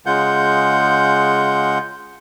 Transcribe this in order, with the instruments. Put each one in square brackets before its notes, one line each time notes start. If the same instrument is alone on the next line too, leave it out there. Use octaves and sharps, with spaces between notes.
[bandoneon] C#3 G#3 F4 F#5 G6